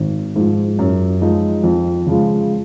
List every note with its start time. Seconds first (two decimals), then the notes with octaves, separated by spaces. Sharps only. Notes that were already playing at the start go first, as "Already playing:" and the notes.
Already playing: G#1
0.36 G#2 F3
0.79 F#2
1.21 F3 G#3 D#4
1.63 F2
2.07 C#3 F3 G#3